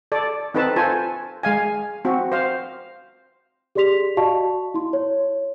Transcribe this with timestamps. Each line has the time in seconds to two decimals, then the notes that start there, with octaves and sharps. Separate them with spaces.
0.12 A4 D5
0.54 C4 D#4 A4 B4 A5
0.76 F4 A4 C5 G#5
1.43 G#3 F5 G#5
2.05 C4 F#4
2.32 C5 F5
3.75 G4 G#4 D5 C6 B6 F7
4.17 F#4 D5 D#5 F5 A5 C#6
4.74 E4 C6
4.93 C#5